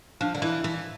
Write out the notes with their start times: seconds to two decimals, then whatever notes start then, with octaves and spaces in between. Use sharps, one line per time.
0.21 F3 D4
0.35 D3
0.42 E3 E4
0.64 E3